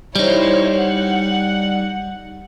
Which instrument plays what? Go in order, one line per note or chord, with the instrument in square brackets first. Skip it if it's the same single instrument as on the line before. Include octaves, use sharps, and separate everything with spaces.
[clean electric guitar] G3 D#4 [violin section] E4 C5 C#5
[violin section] F#5